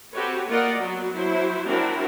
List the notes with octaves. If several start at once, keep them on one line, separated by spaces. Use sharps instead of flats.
C4 F#4 G4 A4 B4 C#5
A#3 F4 A#4 D5 D#5 F#5
F#3 B3
F#3 E4 C5
F#3 C4 D4 E4 F#4 A#4